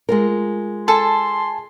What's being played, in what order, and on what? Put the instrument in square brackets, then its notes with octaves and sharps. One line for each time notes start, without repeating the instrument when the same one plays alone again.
[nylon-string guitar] G#3 F4 A#4
[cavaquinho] A4 [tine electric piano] G#5 A5 [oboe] C6